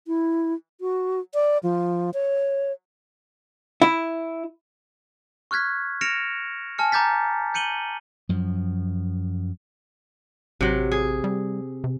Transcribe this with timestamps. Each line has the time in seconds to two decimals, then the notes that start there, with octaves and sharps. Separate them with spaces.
0.07 E4
0.81 F#4
1.34 D5
1.63 F3
2.14 C#5
3.82 E4
5.51 C#6 F6 F#6 G#6 B6
6.01 F6 A#6 C#7 D7 E7 F7
6.78 G#5 A5 F6 C#7
6.92 A#5 D6 G6 A6 B6
7.54 G6 C#7 D#7 F#7 G7
8.29 F#2 F3
10.61 A1 C3 F#3
10.92 G#4
11.24 G3
11.84 C3